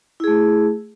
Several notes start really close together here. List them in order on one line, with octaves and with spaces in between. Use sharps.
E4 G#4 A3